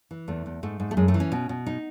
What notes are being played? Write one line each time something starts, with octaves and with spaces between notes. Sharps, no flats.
E3
E2 A3
E2
G#2 A3
G#2
A3
F#2 G#3
A3
E3
C#4
B2
B2
D#4